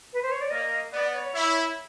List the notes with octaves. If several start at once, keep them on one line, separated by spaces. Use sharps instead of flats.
B4
C5
C#5
D5
A#3 D#5
B3 D5
C#5
E4